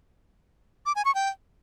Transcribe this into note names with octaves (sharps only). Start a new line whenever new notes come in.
D6
G#5
C#6
G5